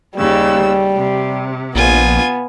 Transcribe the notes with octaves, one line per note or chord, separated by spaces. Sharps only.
D#2 C#3 G3 E6
C3
A#1 B3 F4 G#5